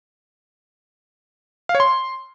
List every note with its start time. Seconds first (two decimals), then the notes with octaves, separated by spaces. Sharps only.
1.69 F5
1.75 C#5
1.80 C6